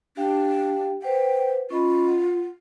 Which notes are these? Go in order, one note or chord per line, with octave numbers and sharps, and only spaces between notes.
D4 G4 F5 G5
B4 C5 F#5 G5
C#4 F4 D#5 B5
F#5